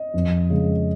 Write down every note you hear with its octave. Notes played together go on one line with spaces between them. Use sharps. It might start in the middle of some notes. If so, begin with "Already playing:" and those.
Already playing: D#5
F2
C#3 G#3